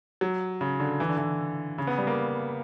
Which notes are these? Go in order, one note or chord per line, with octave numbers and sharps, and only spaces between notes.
F#3
C#3
D3
E3
D3
E3
C#3
B3
G3
A#3